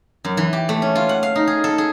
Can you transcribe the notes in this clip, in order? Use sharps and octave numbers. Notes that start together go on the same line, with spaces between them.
F#2
E3
G4
A3
C#4
F4
F#5
F5
D#4
G#4
A4
G#4